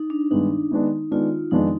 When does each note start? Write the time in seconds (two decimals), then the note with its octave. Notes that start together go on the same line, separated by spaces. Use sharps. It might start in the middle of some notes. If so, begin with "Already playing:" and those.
Already playing: D#4
0.10 D4
0.31 G2 D#3 G#3 B3 D#4
0.71 D#3 G#3 B3 D4
1.11 D#3 G#3 B3 D4 F4
1.51 F2 D#3 G#3 B3 D4 D#4